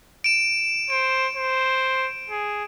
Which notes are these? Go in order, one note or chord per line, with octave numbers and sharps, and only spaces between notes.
D7 E7
C5 D7
C5
G#4